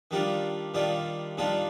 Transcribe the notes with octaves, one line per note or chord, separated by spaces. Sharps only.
D#3 G3 D4 F4
D#3 G3 D4 F4
D#3 G3 D4 F4